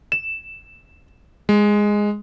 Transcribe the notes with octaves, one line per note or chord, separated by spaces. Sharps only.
E7
G#3